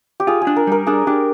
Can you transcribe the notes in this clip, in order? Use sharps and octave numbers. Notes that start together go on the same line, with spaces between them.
G4
F4 G#4
G#4
D4
A#4
G3 A#4
D4 G#4
D4 G4